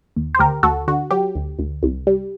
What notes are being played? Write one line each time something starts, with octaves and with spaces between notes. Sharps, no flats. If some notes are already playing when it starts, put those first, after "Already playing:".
D#2
C5
D2 G4 A#4
D2 F#4 A4
D3 F#4
F#3 G4
D2
D2
C2
G3